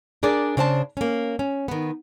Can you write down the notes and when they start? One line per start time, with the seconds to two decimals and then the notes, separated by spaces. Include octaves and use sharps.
0.23 D4 G#4 A#4 D5
0.57 C#3 D4 C5 G5 A5
0.97 A#3 C#4
1.39 C#4
1.68 D#3 B3